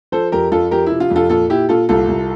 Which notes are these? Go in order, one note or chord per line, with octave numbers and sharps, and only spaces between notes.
F3 A4 C5
F2 G4 A#4
F2 F4 A4
F3 G4 A#4
C3 E4
F4
F2
F4 A4
A#2 F4 A4
A#2 E4 G4
A#2 F4 A4
C2 F4 A4
C2